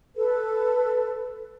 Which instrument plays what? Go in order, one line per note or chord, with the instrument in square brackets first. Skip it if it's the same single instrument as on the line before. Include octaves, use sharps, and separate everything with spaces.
[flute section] A4 B4